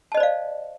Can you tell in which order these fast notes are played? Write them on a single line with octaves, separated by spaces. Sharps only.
A5 D#5 C5 D5 F5